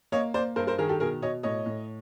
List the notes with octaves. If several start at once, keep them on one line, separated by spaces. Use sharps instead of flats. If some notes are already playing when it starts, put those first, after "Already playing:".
A#3 C#5 D#5
A#3 C5 D5
G2 A#4 C5
A#4 C5
D#3 G#4 A#4
G4 A4
B2 G#4 A#4
B2 C#5 D#5
A2 C#5 D#5
A2